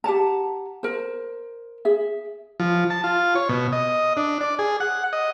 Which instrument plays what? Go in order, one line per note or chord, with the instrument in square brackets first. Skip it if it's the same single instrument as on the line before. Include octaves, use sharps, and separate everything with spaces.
[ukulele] G4 F#5 A5 A#5
A#4 C5
G#4 E5
[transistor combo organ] F3
A5
F4
C#5
B2
D#5
D4
D5
G#4
F#5
D#5